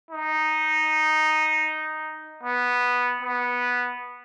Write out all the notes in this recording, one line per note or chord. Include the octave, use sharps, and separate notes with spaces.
D#4
B3
B3